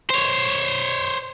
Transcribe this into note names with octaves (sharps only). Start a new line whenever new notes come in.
C5 C#5